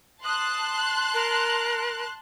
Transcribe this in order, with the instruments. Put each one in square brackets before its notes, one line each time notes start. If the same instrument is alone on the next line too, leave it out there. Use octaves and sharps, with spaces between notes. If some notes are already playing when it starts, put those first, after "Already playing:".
[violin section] A5 C6 F#6 [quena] D#6
[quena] A#4